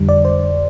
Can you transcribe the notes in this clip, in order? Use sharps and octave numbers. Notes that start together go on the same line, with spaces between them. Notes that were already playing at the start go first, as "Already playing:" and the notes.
Already playing: F2 D3 G3
D5
C5